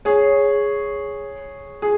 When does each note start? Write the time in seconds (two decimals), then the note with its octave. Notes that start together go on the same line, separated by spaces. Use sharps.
0.05 G#4 C#5
1.82 G#4